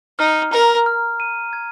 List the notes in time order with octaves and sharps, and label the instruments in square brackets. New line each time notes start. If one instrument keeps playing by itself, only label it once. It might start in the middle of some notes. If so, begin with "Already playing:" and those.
[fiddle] D#4 [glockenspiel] F6
[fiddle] A#4 [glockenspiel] A#5
[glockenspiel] F6
D#7
G#6